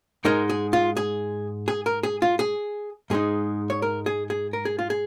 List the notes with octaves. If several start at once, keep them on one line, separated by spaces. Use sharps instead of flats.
G#2 G#3 D#4 A#4
G#4
F4
G#4
G#4
A#4
G#4
F4
G#4
G#2 G#3 D#4 G#4
C#5
A#4
G#4
G#4
A#4
G#4
F4
G#4